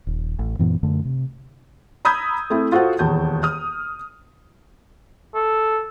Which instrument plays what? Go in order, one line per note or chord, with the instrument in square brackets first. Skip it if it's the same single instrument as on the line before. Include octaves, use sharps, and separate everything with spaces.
[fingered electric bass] D#1
A1
F#2 A#2 E3 B3
F#2 D3 A3
C3
[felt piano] A#5 B5 D#6 E6 G6 G#6
A3 C4 E4
F4 F#4 A4 C5 F#5
D#1 E2 A5 G6
D#6 F6
[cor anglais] A4